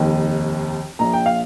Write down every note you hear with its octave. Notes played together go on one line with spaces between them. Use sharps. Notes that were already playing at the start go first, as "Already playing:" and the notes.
Already playing: F1 D#2 D#3
A#1 A#2 A#5
G5
F5